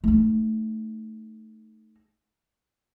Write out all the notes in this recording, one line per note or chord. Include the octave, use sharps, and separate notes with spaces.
A3 D#4